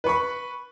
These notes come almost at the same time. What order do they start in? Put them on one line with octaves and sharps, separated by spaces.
B4 C#6 B5